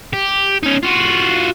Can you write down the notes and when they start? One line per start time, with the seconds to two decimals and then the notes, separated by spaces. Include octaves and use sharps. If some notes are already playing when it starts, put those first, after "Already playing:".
0.13 G4
0.63 C#4 D#4
0.83 F4 F#4